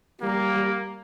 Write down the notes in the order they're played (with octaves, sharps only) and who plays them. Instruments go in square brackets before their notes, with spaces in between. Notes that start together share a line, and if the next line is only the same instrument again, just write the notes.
[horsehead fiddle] G3 [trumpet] A#3